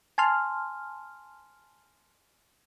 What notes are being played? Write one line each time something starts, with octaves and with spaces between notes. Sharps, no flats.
G#5 A5 C6 F6